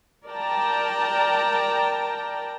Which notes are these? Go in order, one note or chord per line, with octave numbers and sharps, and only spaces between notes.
A#4 D5 G5 A5 A#5